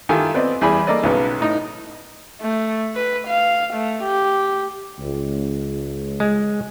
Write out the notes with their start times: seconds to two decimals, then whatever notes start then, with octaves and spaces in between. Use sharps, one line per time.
0.09 D#3 E4 F4 G4 A4 G#5
0.34 B3 C4 D5 D#5
0.61 E2 G3 G#4 G#5 B5 D6
0.87 A#3 A4 D5 D#5
1.03 B1 C#3 F#3 B3
1.40 A2 D#4
2.41 A3
2.95 B4
3.27 F5
3.74 A3
4.04 G4
5.00 C#2
6.20 G#3